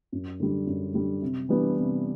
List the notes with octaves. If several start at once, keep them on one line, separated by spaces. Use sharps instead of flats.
F#2
D3 G3
F#2
D3 G3
C3
E3 G3 B3 D4
C3